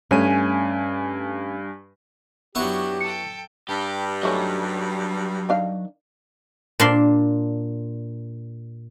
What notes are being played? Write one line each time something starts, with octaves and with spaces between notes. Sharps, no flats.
G2 A3 C#4 G#5 D#7
F#2 F#3 B3 D4 E4 G4 C#6
A4 G5 C#7
G2 G3 G4
D#3 F#3 A3 C#4
D#3 D4 F5
A#2 D4 C6